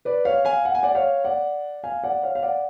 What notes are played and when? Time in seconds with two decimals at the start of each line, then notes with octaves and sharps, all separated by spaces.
0.05 B4 D5
0.25 C#5 F5
0.45 F5 G#5
0.65 F#5
0.75 G#5
0.83 D5 F#5
0.95 C#5 F5
1.24 D5 F#5
1.84 F5 G#5
2.04 D5 F#5
2.23 C#5 F5
2.35 F5
2.43 D5 F#5